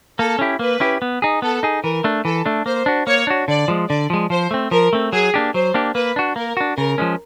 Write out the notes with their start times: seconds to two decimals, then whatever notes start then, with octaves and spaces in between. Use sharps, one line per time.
0.18 A#3 A4
0.39 C#4 E4 G4
0.59 A#3 B4
0.80 C#4 E4 G4
1.02 B3
1.22 D#4 G#4
1.42 B3 A4
1.63 D#4 G#4
1.83 E3 A#4
2.04 A3 D4
2.24 E3 A4
2.46 A3 D4
2.66 A#3 C5
2.86 D4 F#4
3.07 A#3 C#5
3.27 D4 F#4
3.48 D3 D5
3.68 F3 G#3
3.89 D3 D5
4.10 F3 G#3
4.30 F3 C5
4.51 A3 C4
4.71 F3 A#4
4.93 A3 C4
5.12 F#3 G#4
5.34 A#3 D4 G4
5.54 F#3 C5
5.74 A#3 D4 G4
5.95 A#3 B4
6.16 D4 F#4
6.36 A#3 A#4
6.57 D4 F#4
6.77 C#3 A#4
6.98 F3 G#3 C#4